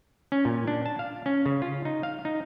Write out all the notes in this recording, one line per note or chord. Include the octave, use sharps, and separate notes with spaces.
C#4
A#2
D4
A5
F5
C#4
C#3
F4
D#4
F5
D#4